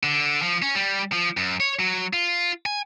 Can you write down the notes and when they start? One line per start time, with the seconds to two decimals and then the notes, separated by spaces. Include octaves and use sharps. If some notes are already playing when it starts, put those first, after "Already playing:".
0.03 D3
0.42 F3
0.62 C#4
0.75 G3
1.12 F3
1.37 F#2
1.60 C#5
1.79 F#3
2.13 F4
2.66 G#5